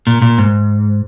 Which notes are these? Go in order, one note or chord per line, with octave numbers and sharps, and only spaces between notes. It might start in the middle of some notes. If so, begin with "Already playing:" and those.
A#2
A#2
G#2